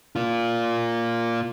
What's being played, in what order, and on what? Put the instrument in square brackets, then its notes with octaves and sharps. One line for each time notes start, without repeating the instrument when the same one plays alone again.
[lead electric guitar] A#3 F4